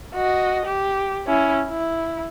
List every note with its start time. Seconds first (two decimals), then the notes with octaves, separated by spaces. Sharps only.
0.15 F#4 D#5
0.66 G4
1.27 C#4 E4
1.69 E4